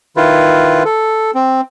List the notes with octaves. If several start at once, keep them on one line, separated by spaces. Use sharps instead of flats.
D#3 E4 F4 B4
A4
C4